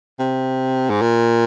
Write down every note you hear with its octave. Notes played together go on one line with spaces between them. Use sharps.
C3
G#2
A#2